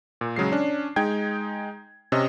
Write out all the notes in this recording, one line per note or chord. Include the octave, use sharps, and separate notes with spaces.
A#2
C#3 F#3 G#3 C7
C#4 D4
G#3 D#4 G5 G#6
C3 C#4 D#5